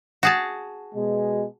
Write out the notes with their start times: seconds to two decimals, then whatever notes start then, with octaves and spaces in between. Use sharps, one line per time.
0.23 F#4 G#4 A5
0.95 B2 G#3